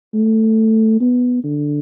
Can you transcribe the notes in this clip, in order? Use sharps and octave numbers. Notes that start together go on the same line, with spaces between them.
A3
B3
D3